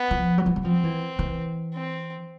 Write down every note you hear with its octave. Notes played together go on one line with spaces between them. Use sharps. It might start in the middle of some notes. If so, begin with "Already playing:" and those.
Already playing: B3
F3
F#3
F3
F#3
F3 C4
E3
E3
C4